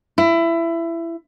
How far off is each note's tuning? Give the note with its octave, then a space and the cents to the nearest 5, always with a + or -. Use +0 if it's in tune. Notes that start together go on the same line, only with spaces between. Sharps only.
E4 +20